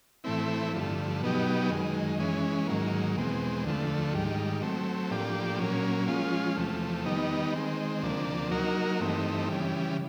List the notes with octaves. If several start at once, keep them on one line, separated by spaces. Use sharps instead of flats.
A2 E3 A3 C4 E4
G2 D3 F3 A3
B2 F#3 B3 D#4 G4
F#2 D#3 G#3
E3 G#3 C#4
G#2 D#3 F#3 A#3
E2 B2 G#3 C4
D2 D3 F3 A3
G#2 D#3 G3
F#3 A3 C4
A2 F3 A#3 D4 G4
A#2 F#3 A#3 C#4
F3 G#3 C#4 F4
E2 C3 F3 A3
D#3 G3 B3 D#4
D#3 G#3 C4
D2 C3 F3 A#3 D4
F#3 A#3 D#4 F#4 A#4
G2 E3 A3 C4 D#4
C#3 E3 G3